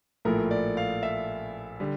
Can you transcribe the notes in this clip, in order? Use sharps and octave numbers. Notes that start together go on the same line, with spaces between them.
A#1 A2 F3 A3 A#4
D5
F5
E5
D3 G3